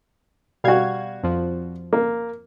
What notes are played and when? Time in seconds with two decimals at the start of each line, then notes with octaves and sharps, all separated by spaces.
0.64 B2 G3 F#4 F5 G#6
1.23 F2 F3
1.93 A#3